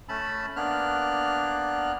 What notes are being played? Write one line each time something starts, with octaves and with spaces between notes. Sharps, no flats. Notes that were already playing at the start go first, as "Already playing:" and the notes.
A3 C#4 A5 B5 E6
A#3 B3 D4 F6 F#6